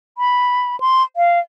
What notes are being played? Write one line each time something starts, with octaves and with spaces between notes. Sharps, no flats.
B5
C6
F5